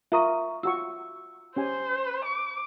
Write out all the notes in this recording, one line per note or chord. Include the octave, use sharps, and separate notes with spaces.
F4 A#4 E5 A#5 C#6 D#6
F4 F#4 C#6 E6
C#4 G4 C5 G#5
D6